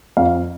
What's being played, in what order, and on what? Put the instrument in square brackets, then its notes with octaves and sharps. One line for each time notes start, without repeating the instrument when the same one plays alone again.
[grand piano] F2 F5